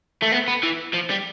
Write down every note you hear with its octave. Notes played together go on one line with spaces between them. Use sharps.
A3
B3
B3
E3
F3
G3